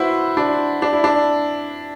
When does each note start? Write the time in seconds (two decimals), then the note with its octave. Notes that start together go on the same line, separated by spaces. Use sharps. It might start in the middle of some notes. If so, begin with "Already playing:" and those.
Already playing: E4 F#4 B4 C5
0.37 D4
0.82 D4
0.93 E4
1.04 D4